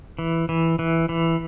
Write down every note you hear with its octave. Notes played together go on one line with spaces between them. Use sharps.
E3
E3
E3
E3